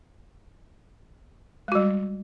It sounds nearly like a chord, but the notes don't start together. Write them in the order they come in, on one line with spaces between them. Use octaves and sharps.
G#3 F#4 G3